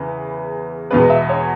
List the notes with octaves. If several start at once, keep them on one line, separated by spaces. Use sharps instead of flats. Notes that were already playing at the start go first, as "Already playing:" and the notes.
Already playing: E2 C#3 E3 B4
E2 B2 G#3 B3 B4
E5
C#5